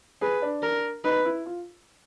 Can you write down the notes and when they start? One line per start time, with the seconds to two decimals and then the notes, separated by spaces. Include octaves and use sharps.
0.21 G#4 B4
0.42 D4
0.62 A#4
1.04 D#4 B4
1.25 E4
1.46 F4